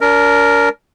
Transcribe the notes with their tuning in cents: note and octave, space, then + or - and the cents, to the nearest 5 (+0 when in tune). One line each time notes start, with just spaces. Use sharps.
D4 -35 A#4 +0